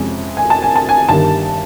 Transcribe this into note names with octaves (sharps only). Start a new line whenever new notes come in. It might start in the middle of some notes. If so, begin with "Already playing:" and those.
Already playing: F2 C3 F3 G#3 C#4
G#5
A5
G#5
A5
G#5
G1 G2 D#3 G3 A5